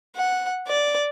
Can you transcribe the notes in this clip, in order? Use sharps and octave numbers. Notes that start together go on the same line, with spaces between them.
F#5
D5